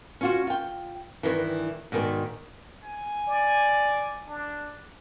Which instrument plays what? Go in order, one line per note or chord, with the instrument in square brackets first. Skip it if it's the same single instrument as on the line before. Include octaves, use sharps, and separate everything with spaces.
[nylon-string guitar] C#4 F4 F#4
F4 G5
G2 A#2 D#3 E3
G#2 B2 D#3 C5 D5
[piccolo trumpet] G#5
[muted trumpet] D5
D4